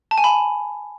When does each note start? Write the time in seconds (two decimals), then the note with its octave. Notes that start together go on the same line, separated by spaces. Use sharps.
0.11 A5
0.18 G#5
0.24 B5